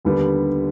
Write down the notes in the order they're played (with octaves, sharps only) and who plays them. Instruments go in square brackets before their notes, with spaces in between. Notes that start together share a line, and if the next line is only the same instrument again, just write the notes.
[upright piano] D#2 D3 G3 B3